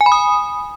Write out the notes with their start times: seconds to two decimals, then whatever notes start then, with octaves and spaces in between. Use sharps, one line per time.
0.01 G#5
0.06 B5
0.12 D#6